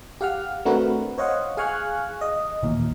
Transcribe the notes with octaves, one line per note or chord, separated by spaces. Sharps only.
G4 F5 F#5 F6
A3 C4 D4 F#4 A#4 B4
C5 C#5 D#5 F5 F#5
G#4 F5 G#5 C#6 F6 F#6
D#5
A1 D#2 A#2